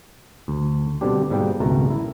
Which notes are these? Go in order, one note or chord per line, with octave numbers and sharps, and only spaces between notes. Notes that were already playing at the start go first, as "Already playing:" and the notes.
D2
B2 D3 G3 C4 D4 G4
G#2 B2 G3 A#3 G5
G#1 C#2 B2 A3 A#4 A#5
E4